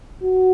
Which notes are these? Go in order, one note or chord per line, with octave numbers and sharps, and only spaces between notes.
F#4